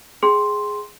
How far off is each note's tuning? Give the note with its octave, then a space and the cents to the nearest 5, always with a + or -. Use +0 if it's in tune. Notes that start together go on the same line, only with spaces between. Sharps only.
G#4 +0 G5 +0 C6 +0